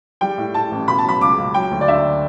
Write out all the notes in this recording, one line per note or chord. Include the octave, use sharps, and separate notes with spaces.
G3 G5
A2
A2 A5
A1
B2 B5
A5
F#3 B5
C#2 D6
C#2
F#3 G5
D2
D5
D3 E5